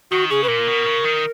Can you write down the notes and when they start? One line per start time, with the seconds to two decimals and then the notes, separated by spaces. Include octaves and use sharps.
0.11 D#3 F#4
0.30 C#3 G#4
0.44 B4
0.48 A#2 A#4
0.67 B2
0.86 C#3
1.04 D#3